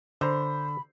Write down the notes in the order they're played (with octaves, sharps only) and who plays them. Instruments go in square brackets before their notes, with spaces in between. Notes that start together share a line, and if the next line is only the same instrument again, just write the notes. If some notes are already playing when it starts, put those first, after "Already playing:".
[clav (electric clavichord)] D3 A#5 [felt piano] C5 [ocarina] B5